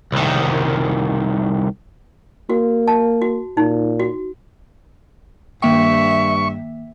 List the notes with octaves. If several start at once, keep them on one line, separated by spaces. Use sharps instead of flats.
C2 D#3
A#3 F#4
A5
F#4
A#2 D#4
F#4
G2 D#3 A#3 E5 G5 C#6